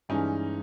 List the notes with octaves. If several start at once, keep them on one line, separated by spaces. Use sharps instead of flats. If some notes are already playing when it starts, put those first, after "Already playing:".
G2 E3 G#3 C#4 D#4